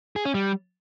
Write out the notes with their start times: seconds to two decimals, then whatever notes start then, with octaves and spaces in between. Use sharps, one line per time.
0.16 G#4
0.25 C#4
0.34 G3